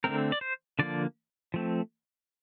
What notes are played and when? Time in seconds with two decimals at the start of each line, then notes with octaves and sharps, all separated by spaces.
0.04 D3 A3 C4 A#4
0.32 D5
0.41 C5
0.79 D3 F3 A#3 D5
1.54 F3 A3 C4